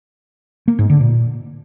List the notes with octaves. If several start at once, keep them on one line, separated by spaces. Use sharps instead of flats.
A#3
G#2
D3
A#2